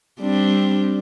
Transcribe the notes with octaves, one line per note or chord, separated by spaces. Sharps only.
G3 C4 D4